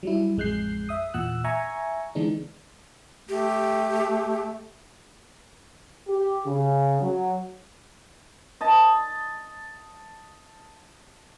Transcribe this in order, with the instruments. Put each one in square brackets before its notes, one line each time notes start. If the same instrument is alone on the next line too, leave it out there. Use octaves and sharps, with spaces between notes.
[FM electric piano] F#3 G3 E4
A1 F2 G#3 F#6 G6 C7
E5 D#6
E2 A#2 F#5 E6 F#6
E5 G#5 A#5 C#6
D3 E3 G#3 B3 D4 D#4
[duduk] A3 [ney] G4
[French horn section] G4
C#3
F#3
[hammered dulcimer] D#5 A5